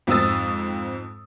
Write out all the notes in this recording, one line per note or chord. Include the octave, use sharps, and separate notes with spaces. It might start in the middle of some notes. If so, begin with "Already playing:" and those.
F2 G#2 C4 D#6 E6 A6